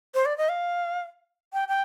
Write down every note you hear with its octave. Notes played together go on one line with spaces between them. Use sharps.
C5
D5
D#5
F5
G5
G5